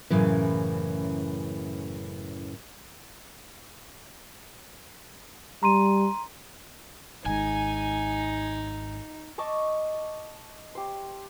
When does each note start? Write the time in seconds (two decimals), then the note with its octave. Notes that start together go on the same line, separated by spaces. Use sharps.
0.10 F#2 A2 C#3 E3
5.63 G3 A#5 C6 D#7
7.26 G#1 G#2 D#4 G#5
9.38 D#5 A5 C#6 D6
10.75 G4 C5